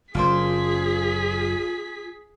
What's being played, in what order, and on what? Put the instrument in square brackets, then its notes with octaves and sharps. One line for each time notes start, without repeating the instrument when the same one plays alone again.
[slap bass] F#1 [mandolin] A#3 D4 C5 [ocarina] F4 [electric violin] G#4 B6